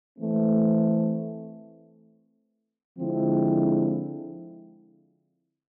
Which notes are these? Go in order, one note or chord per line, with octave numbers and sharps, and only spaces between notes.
E3 A3 C4
D3 F3 G#3 C4 E4